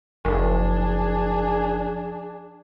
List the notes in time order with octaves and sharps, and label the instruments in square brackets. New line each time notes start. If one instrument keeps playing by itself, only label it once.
[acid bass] F#1 [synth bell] F3 [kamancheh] D4 G#4